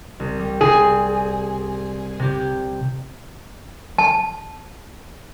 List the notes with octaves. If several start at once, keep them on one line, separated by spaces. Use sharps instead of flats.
C2
G3
C3 C4 G#4
C3 G4
A5